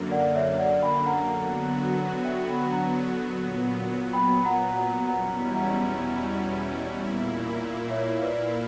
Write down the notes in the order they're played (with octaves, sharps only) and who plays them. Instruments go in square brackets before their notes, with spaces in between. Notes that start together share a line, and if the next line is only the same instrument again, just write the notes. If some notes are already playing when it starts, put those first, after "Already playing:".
Already playing: [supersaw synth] F#2 D3 A#3
[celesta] D5 F#5
C#5 E5
D5 F#5
G5 B5
F#5 A#5
[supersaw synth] D3 F#3 B3 F#4
[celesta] E5 G5
G5 B5
F#5 A#5
[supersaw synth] A#2 F#3 B3
[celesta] G5 B5
F#5 A#5
F#5 A#5
[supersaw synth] E2 B2 G3 C#4 E4 [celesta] F#5 A#5
[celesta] F#5 A#5
[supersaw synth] A#2 A#3 E4
[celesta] C#5 E5
B4 D5